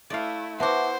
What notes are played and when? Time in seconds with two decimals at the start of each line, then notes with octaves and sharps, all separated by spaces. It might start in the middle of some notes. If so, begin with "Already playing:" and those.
0.10 A3 E4 D5 F5
0.60 B3 E4 F#4 C5 E5 A5 D6